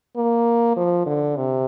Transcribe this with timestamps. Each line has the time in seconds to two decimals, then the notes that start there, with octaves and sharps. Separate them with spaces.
0.17 A#3
0.77 F3
1.06 D3
1.37 C3